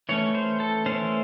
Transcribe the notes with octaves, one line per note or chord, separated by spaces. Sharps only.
E3 A3 C#4 C#5
C5
A4
E3 A3 C#4 C5